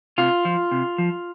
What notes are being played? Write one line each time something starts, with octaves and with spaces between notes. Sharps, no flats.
C3 F4
F3
C3
F3